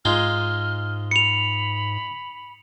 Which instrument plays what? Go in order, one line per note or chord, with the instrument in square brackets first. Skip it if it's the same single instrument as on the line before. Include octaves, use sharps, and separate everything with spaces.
[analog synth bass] G#2 [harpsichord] G#3 D#4 F4 [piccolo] F6
[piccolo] B5 [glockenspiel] C#7 F7